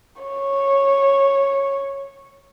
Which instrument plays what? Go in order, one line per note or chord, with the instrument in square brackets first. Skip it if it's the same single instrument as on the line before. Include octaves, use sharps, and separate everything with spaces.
[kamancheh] C#5